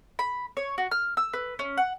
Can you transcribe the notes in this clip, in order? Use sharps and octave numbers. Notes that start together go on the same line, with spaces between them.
B5
C#5
F#4
F6
E6
B4
C#4
F#5